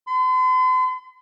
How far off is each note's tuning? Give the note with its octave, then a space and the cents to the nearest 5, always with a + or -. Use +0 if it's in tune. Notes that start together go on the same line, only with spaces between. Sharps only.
C6 -45